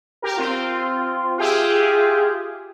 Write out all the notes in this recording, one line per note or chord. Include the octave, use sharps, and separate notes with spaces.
G4 A#4
C4 F4
F4 G4 G#4 E5